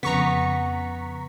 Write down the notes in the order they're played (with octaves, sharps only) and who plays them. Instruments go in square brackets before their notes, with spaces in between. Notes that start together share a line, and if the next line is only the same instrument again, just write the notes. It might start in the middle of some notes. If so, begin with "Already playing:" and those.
[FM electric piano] F2 C#3 [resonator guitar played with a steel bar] B3 [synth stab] A#5 C#6 B6